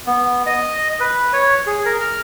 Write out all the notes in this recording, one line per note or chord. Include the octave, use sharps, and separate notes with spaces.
B3
D#5
B4
C#5
G#4
A#4
F6